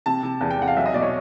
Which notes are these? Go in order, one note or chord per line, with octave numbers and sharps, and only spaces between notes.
C3 A5
C3
E2 A5
G5
E2 F#5
F5
B1 E5
D#5
B2 D5
C#5